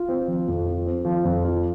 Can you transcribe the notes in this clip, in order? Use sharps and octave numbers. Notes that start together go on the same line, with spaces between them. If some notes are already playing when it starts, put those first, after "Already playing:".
Already playing: F4
C4
F3
F2
F4
C4
F3
F2
F4